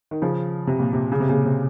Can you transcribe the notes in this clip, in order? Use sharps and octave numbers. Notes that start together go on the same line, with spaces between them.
D#3
C#3 F3
C3
A#2
C3
C#3
C3
A#2 C#3
C3